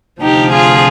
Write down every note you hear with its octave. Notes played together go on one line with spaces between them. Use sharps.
D2 C3 F3 D#4 G4
F4 G#4